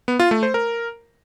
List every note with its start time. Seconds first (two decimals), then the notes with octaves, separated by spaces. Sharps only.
0.08 B3
0.19 F4
0.31 A3
0.43 C5
0.54 A#4